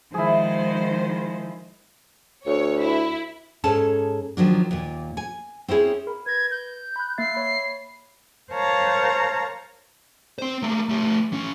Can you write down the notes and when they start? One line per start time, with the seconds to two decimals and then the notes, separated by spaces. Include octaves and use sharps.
0.14 D#3 F3 G#3 E4 G#4 C5
2.46 D2 C#5
2.81 E4
3.64 G#2 C#4 G#4 A4 A5
4.37 D#3 F3 F#3 D4
4.71 D#2 A#2
5.17 G#5
5.68 C4 C#4 E4 G#4
6.07 A#4 B5
6.26 B4 G#6 A#6
6.51 G6
6.96 B5 F#6
7.18 A#3 E5 A6 C7
7.35 C#5 B5
8.52 A#4 C5 C#5 F5 A5 A#5
10.38 C4 C5
10.62 A3 A#3
10.89 A3 G4
11.32 E3 C#4